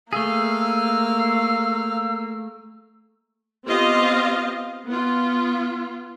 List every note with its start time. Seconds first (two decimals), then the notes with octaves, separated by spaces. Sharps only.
0.13 A3 A#3 G#4 F5 E6
3.67 B3 C4 F4 G4 D#5 F5
4.86 B3 F4